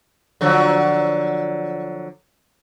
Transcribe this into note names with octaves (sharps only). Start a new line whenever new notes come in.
D3 F3 F#3